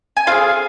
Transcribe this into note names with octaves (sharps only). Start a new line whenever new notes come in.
G#5
C4 F4 G#4 F5